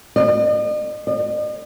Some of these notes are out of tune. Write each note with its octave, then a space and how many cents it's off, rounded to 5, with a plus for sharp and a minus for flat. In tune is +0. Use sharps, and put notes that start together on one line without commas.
D#5 -45
D#5 -45